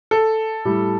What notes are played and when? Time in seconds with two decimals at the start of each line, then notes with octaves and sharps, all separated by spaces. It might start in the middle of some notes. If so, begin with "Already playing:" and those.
0.11 A4
0.65 A2 G3